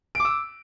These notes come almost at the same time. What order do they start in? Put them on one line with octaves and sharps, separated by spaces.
D7 D6 E6